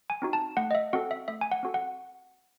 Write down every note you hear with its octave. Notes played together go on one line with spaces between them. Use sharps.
G#5
C4 D#4 F#4
A5
A3 F#5
D#5
E5
C4 F#4 A4 F#5
E5
A3 E5
G#5
F#5
C4 F#4 A4
F#5